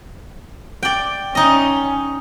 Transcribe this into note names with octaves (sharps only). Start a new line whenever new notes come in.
D5 G5
C#4 D#4 D#5